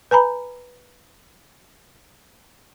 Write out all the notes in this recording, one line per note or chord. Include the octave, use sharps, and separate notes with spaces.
B4 G#5 A#5 B5